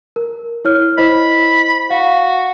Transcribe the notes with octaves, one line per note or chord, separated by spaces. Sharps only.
A#4
E4 C#5 F6
E4 C5 D#5 B5
F#4 F5